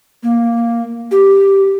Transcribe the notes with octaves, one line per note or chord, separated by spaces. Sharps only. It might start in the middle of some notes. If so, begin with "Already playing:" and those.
A#3
G4